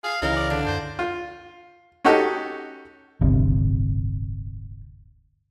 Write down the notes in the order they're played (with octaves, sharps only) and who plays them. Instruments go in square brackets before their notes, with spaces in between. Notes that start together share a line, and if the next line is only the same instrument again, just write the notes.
[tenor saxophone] G#4 [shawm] F5
[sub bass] C#2 [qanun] C#3 E3 F5 [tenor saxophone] D#4 [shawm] A#4
[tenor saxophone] D5
[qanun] D3 [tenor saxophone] D4
[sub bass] F#2 [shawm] C5
[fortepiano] F4
C#4 D#4 F#4 G4 A4
[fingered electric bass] D1 G1 C3